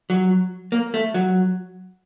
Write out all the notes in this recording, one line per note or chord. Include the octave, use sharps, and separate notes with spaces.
F#3
A#3
A3
F#3